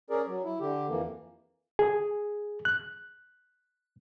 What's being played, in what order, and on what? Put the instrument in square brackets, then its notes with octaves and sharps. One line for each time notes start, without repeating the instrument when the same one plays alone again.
[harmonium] C#4 G#4 A#4 D5
F#3
E4
D3 G4
F2 E3 A#3
[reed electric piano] G#4
F#6